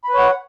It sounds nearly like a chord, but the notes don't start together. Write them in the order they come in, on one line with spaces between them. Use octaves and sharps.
B5 B4 C#5 F#5